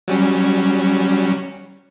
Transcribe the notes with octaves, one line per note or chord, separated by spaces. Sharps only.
F#3 G3 C#4